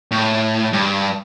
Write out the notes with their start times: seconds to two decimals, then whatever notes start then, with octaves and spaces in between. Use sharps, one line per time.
0.11 A2
0.73 G2